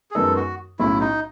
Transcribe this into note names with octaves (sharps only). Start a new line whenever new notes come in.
G#4
F#2 D#3 G#3 B3 D#4 A4
F#4
B1 A2 F#3 C#4 E4
D#4